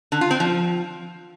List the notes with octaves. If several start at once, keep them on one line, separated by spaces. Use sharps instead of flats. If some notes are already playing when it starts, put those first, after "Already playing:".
D3
F4
C4
F3